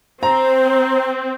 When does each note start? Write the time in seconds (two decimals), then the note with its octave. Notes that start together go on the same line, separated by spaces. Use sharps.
0.23 C4 C5 A#5